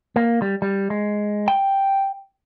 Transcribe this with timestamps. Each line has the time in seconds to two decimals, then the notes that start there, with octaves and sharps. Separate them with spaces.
0.16 A#3
0.42 G3
0.62 G3
0.90 G#3
1.48 G5